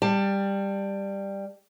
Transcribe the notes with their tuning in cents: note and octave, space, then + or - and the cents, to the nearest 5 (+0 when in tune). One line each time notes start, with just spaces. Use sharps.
G3 +10 A5 +25